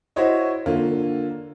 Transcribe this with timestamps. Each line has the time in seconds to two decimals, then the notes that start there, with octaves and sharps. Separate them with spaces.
0.16 E4 F#4 C5 C#5 D#5
0.66 D3 A#3 F4